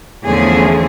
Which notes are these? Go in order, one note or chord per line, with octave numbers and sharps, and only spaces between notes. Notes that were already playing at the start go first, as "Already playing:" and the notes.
E2 D3 F3 A3 C#4 G#4